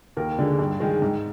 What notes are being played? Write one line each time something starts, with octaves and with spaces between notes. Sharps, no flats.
D#2 A#4
D3 G#3
G2
D#3 G#3
G#2